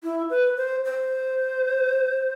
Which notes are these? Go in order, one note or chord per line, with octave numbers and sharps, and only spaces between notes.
E4
B4
C5
C5